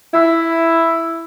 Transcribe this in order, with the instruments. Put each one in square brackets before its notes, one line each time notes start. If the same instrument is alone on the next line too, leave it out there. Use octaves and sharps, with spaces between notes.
[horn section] E4